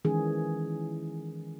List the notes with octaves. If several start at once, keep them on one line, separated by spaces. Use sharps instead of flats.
D#3 E3 G#3 C#4 G#4